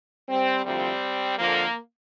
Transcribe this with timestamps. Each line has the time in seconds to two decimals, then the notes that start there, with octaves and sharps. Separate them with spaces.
0.29 G3 C4
0.65 D2 C3 F3 G3 C4
1.38 F2 D3 F3 A#3